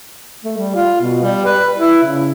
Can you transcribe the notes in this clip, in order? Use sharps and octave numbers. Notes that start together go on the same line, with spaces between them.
A3
G3
F4
B2
G3
B4
E4
C#3